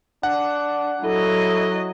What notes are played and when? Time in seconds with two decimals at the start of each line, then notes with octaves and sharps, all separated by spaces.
0.23 D4 F#5
1.03 F#3 E4 A4 D#5